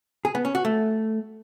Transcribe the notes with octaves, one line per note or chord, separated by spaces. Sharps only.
G#4
B3
C#4
F#4
A3